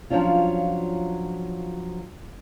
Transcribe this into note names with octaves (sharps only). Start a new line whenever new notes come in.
F3 F#3 C#4 D4 F4